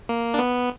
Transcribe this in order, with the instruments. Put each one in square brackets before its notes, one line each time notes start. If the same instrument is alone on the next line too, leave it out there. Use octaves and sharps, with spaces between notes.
[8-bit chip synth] A#3
D4
B3